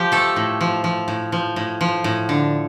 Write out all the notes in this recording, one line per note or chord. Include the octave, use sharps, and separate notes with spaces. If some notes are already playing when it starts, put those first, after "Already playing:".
Already playing: F3 G4
A3 A4
A2
F3
F3
A2
F3
A2
F3
A2
D3